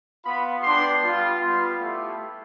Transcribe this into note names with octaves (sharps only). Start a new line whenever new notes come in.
B3 F4 B5
B3 D4 G4 C6
G3 B3 F4
G3 B3 F4 C6
A3 E4 G4